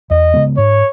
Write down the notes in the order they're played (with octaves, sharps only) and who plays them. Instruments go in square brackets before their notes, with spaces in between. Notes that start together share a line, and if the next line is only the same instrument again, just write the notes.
[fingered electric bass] E2 [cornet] D#5
[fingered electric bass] C#3 G#3 B3
[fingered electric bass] G#2 [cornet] C#5